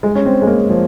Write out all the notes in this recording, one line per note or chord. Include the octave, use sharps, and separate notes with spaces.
G#3
C#4
C4
G#3
A#3
F3